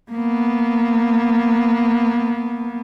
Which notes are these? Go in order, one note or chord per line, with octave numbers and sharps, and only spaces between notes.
A#3 B3